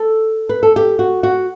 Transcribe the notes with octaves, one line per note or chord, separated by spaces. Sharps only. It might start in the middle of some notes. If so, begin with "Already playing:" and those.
Already playing: A4
B4
A4
G4
F#4
F#4